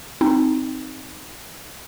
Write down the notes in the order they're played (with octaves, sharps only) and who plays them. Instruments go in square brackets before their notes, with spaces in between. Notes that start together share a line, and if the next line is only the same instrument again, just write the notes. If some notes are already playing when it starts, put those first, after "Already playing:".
[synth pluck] C4 D#4